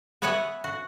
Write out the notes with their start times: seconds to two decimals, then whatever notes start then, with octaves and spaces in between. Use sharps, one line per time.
0.22 B3 B4 C#5 E5 F#5 G#5
0.64 F#4